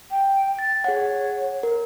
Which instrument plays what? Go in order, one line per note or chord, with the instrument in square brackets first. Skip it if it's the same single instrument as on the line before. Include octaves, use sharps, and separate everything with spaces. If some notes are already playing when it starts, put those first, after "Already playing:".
[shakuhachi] G5
[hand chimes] A6
[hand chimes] G#4 F#5 [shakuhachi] C#5
[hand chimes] A#4